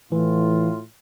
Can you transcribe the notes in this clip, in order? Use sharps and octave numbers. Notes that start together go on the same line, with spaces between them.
A2 E3 F4